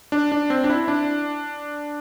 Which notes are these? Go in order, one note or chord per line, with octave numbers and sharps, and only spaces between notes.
D4
D4
C4
D4
E4
D4